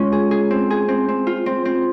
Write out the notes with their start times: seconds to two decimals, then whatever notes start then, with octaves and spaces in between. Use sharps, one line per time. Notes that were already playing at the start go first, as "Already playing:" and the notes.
Already playing: G#3 C#4 F4
0.12 G#4
0.31 G#4
0.51 C4
0.70 G#4
0.88 C4
1.08 C4
1.27 F4
1.46 C4
1.65 C4